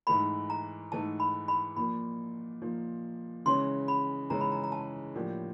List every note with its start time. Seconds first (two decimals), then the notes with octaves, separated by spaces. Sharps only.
0.07 G#2 E3 A3 B5
0.50 A#5
0.92 G#2 E3 A3 A5
1.20 B5
1.48 B5
1.76 A#2 F3 A#3 B5
2.62 A#2 F3 A#3
3.46 C#3 E3 G#3 C#4 C6
3.88 B5
4.30 C#3 E3 G#3 C#4 A#5
4.41 B5
4.52 A#5
4.64 A#5
4.72 A5
5.15 A2 F3 A#3 D4 G4